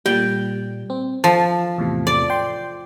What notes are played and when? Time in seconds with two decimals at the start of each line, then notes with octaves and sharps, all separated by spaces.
0.06 A#2 G3 G5
0.90 C4
1.24 F3 A5
1.78 E2 A2 C3
2.07 D5
2.30 G5 C6